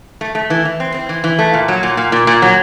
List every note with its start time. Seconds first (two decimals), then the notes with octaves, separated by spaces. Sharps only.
0.21 A3
0.35 A3
0.50 E3
0.65 E3
0.80 C4
0.94 C4
1.09 E3
1.24 E3
1.39 A3
1.54 A#2
1.68 F#3
1.83 A#2
1.97 A#2
2.12 A#2
2.27 A#2
2.42 F#3